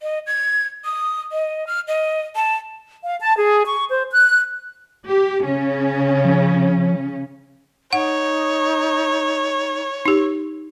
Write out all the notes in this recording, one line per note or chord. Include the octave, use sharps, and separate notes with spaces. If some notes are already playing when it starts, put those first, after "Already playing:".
D#5
G#6
D#6
D#5
F6
D#5
A5
F5
A5
G#4
C#6
C5
F#6
G4
C#3 C#4
F3
D#4 C#5 F#5
D#4 G4